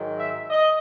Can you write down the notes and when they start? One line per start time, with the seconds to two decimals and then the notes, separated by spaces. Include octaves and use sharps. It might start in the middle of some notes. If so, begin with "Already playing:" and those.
Already playing: G#2 D#3 F#3
0.19 E5
0.50 D#5